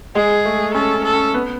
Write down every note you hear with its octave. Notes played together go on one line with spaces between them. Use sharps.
G#3 G#4
A3
C#4 A4
C#4
A4
C#4
B3